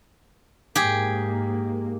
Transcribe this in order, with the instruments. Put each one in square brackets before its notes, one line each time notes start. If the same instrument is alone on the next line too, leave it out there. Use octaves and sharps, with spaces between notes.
[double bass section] G#2 A#3 [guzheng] G4 G#4